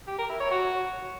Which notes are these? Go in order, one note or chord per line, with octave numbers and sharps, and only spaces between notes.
G4
A#4
E4
C#5
F#4